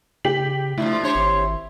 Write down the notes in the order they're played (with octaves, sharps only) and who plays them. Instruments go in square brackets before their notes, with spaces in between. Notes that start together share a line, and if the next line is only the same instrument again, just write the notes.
[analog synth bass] C#3 [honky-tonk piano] G4 B6 F#7
[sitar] B2 D3 F3 [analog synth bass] A3 [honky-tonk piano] E4
[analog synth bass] D4 [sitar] G4 C5 C#5
[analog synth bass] G#1